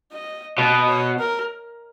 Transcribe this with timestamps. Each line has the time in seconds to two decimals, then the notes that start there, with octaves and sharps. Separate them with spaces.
0.12 D#5
0.58 B2 D#5
0.88 C#5
1.19 A#4